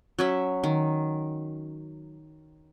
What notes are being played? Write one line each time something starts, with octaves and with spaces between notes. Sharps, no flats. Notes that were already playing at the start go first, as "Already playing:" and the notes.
F#3 C#4 E5
D#3